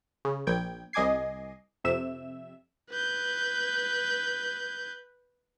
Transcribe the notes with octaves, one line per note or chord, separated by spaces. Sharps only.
C#3
A#1 G5 G#6
C2 D#5 G#5 D6 G#6 C7
F2 C3 E5 E7
B4 G6